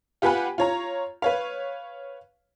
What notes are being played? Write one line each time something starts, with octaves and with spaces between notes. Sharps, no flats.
F4 G4 B4 F#5 G#5 B5
F4 C#5 A#5
B4 C#5 F5